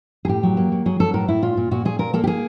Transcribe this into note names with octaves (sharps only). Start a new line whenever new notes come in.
G#4
A2 G4
F#3
A#3
F#3
F#3 G#4
F#3 A4
A2 A#4
A2 E4
A#2 F4
A#2
A#2 F#4
A#2 G#4
A#2 A#4
A#3 A4
G4
A#3 G#4